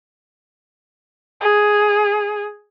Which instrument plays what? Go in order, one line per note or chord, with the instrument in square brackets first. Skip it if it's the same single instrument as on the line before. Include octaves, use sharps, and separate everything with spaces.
[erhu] G#4